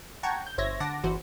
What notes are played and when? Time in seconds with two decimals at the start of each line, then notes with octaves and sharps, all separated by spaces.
0.23 F#5 G5 A5 A#5 C#6 G#6
0.46 G6
0.58 G1 C5 C#5 E5 G#6 A#6
0.80 D3 F#5 A5 D6 A#6
1.03 G1 E2 E3 F#4 C5